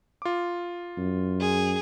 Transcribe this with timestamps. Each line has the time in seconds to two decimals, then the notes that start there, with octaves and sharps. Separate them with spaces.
0.22 F4 D6
0.97 F#2
1.40 G#4